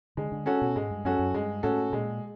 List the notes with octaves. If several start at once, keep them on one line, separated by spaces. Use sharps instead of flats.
D3 G#3
D3
C#4 F#4 A4
B2
G#2 G#3
G2
F#2 C#4 F#4 A4
F#2
G2 G#3
A2 C#4 F#4 A4
A#2 G#3